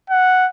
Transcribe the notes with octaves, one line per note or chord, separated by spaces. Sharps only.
F#5